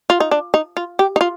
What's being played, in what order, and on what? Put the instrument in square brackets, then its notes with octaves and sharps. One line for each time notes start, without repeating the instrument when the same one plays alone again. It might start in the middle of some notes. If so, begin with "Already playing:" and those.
[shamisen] F4
D#4
D4
D#4
F4
G4
D#4
F4